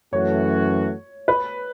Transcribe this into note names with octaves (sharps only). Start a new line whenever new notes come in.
F#2 E3 A3 F#4 C#5
B4